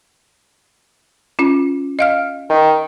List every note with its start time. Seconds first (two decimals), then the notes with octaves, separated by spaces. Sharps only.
1.39 C#4 F4
1.99 D#5 F5 F6
2.49 D#3